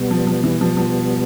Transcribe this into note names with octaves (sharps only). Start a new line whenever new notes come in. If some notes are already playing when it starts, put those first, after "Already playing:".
Already playing: B2 G3 B3
F3
F3
E3
F3
F3